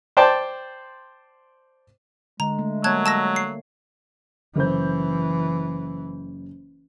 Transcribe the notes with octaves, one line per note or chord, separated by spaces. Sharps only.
C5 D5 G5 A5 C6
D3 G#3 A#5
A3
F#3 G3 A#3 C#5 A5 F#6 G#6
A5 E6 A#6
C7
F#1 E3 C5 G6